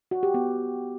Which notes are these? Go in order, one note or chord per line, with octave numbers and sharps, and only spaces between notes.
F#4
G4
B3